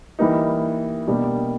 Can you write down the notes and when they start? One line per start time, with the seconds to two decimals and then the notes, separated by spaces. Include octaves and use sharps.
0.19 E3 G3 A#3 D#4
1.07 B2 G3 A#3 D4 G4